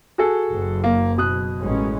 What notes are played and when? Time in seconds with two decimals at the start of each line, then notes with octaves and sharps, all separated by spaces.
0.18 F#4 G#4 A4
0.50 F#1
0.84 A#3
1.18 B2 D#6 F#6
1.60 A1 G#3 C#4